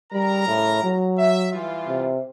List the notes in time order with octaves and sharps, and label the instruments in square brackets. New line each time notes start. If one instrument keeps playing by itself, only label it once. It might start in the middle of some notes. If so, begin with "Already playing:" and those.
[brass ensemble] C#3 A#4 A#5 [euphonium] G3
[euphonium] A2
F#3
[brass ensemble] E5
E3 G3 F4
[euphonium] C3